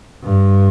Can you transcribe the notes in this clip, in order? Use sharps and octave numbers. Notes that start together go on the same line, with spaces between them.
G2